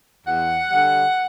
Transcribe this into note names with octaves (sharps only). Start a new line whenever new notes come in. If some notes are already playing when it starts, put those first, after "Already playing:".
E2 F#5
D3 G3